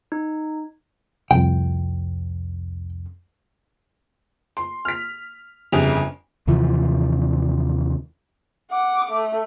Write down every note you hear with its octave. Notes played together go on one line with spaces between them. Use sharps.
D#4
C2 F2 G5
C6
F6 B6
G1 F2 C#3 G4 F7
D#2 C3 E3 F3
F#5 D6
A3